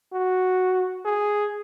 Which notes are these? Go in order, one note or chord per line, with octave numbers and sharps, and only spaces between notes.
F#4
G#4